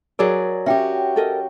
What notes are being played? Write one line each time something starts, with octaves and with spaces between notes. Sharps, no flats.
F#3 G#4 A#4 D5
C#4 F#4 G4 E5 G5
A4 A#4 D#5